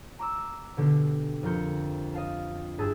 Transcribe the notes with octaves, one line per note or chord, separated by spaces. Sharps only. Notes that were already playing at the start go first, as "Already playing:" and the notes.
A#5 D6 E6
B2 D3 G4
F2 D4 A#4 C6 G6 C#7
D#5 F5 A5
G2 E4 G#4 A5 E6